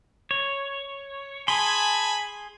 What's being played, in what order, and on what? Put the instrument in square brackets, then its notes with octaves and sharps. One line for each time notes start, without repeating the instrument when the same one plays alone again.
[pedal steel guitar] C#5
[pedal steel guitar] G#4 C6 [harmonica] G#5 A5 B5